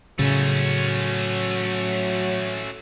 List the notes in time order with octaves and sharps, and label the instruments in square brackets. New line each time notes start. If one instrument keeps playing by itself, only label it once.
[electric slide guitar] A2 G#4 [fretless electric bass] C#3 [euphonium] F#3 [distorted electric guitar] A3 C#4